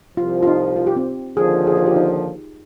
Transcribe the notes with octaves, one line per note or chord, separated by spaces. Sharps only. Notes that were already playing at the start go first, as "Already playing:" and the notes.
C2 C3 F3 F4
F4
D#4
F4
G4
C4
D#2 D3 F3 G#4
G#4
F4
G4
D#4